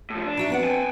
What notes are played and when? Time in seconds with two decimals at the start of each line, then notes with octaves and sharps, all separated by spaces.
0.10 A2 F3
0.26 D4
0.37 D#4 F#4 E5
0.50 B3 C4 F#5
0.64 G5 G#5